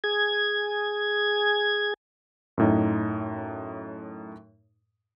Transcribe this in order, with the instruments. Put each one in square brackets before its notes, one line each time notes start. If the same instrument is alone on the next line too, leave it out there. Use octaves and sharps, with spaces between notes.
[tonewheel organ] G#4 G#6
[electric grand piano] F#2 A2 D#4